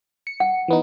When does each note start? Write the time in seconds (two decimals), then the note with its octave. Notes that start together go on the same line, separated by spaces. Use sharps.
0.27 C#7
0.40 F#5
0.68 E3 B3 D#4